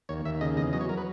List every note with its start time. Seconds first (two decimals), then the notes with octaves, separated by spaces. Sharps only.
0.09 D#2 C#5
0.25 D#2 E5
0.41 C#3 D#5
0.57 E2 D#5
0.73 F#3 D#5
0.81 C#5
0.89 F#3 A#4
0.97 B4